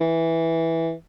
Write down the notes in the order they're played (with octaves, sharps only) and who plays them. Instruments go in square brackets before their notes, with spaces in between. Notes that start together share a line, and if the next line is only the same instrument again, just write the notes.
[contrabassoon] E3